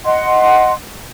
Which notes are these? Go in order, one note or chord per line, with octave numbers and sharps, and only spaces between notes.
D#5 F#5 C6